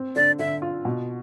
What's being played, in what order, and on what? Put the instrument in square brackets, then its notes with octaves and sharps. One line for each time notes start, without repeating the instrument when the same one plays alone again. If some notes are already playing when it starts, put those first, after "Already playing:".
Already playing: [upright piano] C4
[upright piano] D3 [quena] D5
[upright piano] D3 [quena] E5
[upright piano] F4
B2